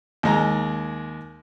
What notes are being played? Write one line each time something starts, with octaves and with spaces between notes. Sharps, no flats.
D#2 G#3 A#5